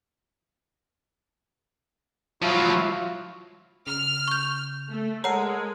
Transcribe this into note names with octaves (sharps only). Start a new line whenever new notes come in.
F3 F#3 E4 F#4 F5
C#3 F6
C#6 G6
A3
G#3 A4 A#4 C#5 F#5